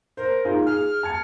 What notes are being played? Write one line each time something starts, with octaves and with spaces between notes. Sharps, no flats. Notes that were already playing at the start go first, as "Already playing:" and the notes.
A#4 C5
D#4 F4 G#4
G#4 F6
A5 G#6 C#7